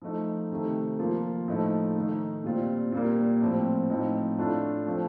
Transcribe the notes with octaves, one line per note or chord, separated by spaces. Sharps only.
F3 A3 D#4
C3 D#3 A3
F3 A#3 F4
A2 F3 A3 D#4
D#3 A3 D#4
A#2 G3 C4 F4
A#2 G3 A#3
A2 F3 C4
A2 F3 C4 D#4
A2 A3 D4 F4
F3 A3 C4 F4